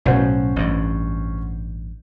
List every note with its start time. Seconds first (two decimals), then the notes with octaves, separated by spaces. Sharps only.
0.05 B1 A2 F#3 C#4 F#4 C5
0.56 A1 G2